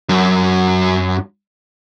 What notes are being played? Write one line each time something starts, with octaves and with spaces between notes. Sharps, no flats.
F#2 F#3